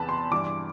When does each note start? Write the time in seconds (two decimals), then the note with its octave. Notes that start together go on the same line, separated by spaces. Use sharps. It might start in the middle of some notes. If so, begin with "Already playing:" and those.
Already playing: E2 C3 E3 B4 A5 B5
0.09 C6
0.31 G2 E3 D6